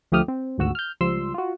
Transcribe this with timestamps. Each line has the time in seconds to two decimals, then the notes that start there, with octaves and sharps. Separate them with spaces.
0.12 D2 F3 A3 G4 D#6 F6
0.28 C4
0.58 G#1 D2 F#4 E6
0.75 F6 G6
1.01 C#2 F3 G3 C6 E6
1.34 F4 F#4